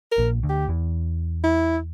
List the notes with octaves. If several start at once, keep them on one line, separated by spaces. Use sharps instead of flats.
A#4
A#1 A#2
D2 D3
G4
E2 E3
E4